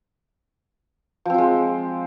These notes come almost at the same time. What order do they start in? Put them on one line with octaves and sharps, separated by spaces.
F3 C4 F4 G#3